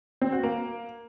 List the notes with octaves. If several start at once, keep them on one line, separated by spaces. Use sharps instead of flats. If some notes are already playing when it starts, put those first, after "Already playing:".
C4
F#4
A#3